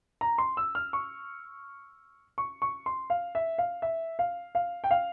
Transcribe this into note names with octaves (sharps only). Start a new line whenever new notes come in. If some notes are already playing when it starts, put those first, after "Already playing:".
A#5
C6
E6
F6
C#6
C#6
C#6
C6
F5
E5
F5
E5
F5
F5
G5
F5